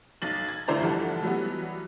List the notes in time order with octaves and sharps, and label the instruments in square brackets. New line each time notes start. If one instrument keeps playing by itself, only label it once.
[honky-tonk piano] B1 A6 F#7
G#6
G1 D2 E4 C5 D5 A#5
F1 E3 F3 G3 A4 F#5
E3 F#3 G3 B3